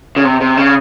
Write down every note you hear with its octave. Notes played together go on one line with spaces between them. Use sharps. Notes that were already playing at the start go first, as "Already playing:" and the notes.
C#3
C3
C3
C#3